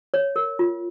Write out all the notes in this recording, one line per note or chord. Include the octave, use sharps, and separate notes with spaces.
C#5
A#4
F4